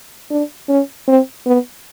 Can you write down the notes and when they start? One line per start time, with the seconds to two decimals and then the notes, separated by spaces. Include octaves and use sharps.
0.31 D4
0.69 C#4
1.08 C4
1.46 B3